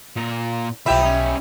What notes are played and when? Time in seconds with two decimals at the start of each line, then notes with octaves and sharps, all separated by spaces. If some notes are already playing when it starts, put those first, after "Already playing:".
0.16 A#2 A#4
0.86 B1 F3 E4 G4 E5 G5 B5
1.01 C#4 D#4